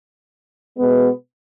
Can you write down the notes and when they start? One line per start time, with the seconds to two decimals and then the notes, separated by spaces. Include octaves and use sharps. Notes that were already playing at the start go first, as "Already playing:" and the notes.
0.78 B2 G#3 B3